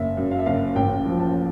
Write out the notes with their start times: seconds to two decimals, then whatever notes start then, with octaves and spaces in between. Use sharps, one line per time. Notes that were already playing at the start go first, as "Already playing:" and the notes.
Already playing: F#1 E5
0.17 F#2
0.31 F5
0.39 E5
0.46 F#1 F5
0.76 A1 G5
1.05 F3
1.20 A5